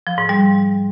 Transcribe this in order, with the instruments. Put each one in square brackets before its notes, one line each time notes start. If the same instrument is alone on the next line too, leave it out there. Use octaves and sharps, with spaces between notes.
[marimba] F3
G#2
G3